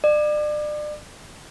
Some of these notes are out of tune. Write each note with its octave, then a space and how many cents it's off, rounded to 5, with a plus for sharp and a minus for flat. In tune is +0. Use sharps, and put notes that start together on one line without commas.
D5 +35